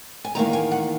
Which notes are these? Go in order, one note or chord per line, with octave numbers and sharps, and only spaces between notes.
G#5
E2 D#3 A#3 A#5
G#5
F#5